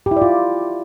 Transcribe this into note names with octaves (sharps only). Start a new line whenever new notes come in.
G4
E4
D5
F4